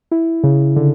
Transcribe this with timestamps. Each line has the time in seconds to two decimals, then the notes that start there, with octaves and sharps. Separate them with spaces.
0.12 E4
0.44 C#3
0.76 D3